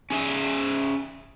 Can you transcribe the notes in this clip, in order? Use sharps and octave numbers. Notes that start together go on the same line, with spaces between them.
C#4 G#4 E5